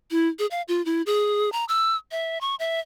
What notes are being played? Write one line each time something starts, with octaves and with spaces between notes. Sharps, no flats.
E4
G#4
F5
F4
E4
G#4
A#5
E6
E5
C#6
E5